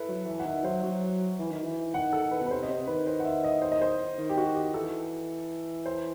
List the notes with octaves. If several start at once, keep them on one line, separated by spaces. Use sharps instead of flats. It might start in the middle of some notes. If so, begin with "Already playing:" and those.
Already playing: E4 A4 B4
F#3
E3
F#5
D#3 E5
F#3 C5
F#3
E3
D#3
E3
D#3 F#5
A4
B4
B2
B4
C3 C5
D#5
C3 C5
D#3 B4
C5
F#5
E5
D#5
C5
D#5
C5
D#3
G4
F#4
G4
E3 A4
C5